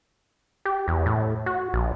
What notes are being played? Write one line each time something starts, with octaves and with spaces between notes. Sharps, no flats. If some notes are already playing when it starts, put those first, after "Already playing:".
G4
E2
A2
F#4
A#1